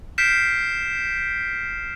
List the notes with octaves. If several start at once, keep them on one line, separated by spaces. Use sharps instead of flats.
F6 G6 B6 C7 D7 E7